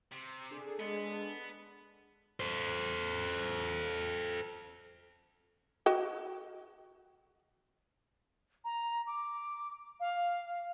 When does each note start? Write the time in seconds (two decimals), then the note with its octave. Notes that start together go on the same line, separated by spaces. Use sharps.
0.12 C3
0.51 D4 G#4 A4
0.80 G#3 B3
2.40 A4 C5
5.86 F#4 D#5 G5
8.64 A#5
9.07 D6
10.00 F5